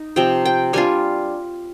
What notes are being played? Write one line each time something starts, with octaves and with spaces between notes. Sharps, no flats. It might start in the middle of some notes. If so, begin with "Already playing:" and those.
Already playing: D#4
C3 F3 C4 G5
G5
G3 D4 F4 G#5